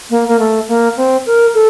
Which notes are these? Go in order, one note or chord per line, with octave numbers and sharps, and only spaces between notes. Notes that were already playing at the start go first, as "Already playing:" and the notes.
A#3
A#3
A3
A#3
C4
A#4
A4